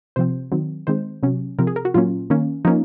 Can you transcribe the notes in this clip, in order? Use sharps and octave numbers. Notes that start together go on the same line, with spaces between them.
C3 F3 C4 C5
D#3 F#3 C4
D#3 G#3 C4 C5
C3 F#3 C#4
C3 F3 C4 A#4
G#4
A#4
F#4
A#2 F#3 A#3 C#4 F4
D#3 A#3 C#4
F3 A#3 C#4 D#4